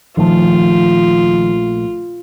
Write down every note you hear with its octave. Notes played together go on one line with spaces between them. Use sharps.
A#1 D#3 F3 A3 F4